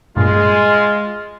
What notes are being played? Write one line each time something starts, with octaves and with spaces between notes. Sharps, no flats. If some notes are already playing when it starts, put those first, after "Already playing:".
G2 A#2 G#3 F4